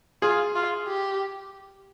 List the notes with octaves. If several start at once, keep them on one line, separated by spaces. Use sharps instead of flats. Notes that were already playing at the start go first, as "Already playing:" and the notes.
F4 G#4
F4
G4